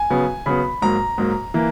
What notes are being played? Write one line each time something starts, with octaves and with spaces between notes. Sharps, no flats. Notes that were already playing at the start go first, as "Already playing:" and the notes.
Already playing: G#5
C#3 F#3 B3
C#3 F#3 B3 B5
G#2 F#3 A#3 A#5
G#2 F#3 A#3
E3 A#3